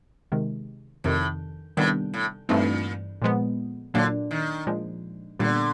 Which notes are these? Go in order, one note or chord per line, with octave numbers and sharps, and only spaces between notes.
C3 D#3 G#3
F2 A2 C3 D#3
A2 C3 D#3 G3 B3 D4
A2
G2 A#2 E3 A3 C4 D#4
A#2 F3 G#3 B3
A#2 D3 F#3 A#3 D4
D#3
A#2 F3 G#3
A#2 D3 G3 B3